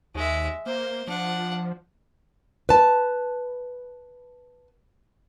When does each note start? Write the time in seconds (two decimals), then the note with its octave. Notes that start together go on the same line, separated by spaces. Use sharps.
0.15 D#2 G#3 E5
0.66 A#3 C5
1.07 F3 D4 F#5
2.69 B4 A5